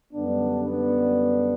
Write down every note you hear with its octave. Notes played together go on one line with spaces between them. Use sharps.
F#2 D3 G3 B3 D4
B3 D4